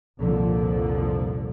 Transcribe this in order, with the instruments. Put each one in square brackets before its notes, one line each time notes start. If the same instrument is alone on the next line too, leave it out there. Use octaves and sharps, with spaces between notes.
[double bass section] C2 F2 A#2 D3 F3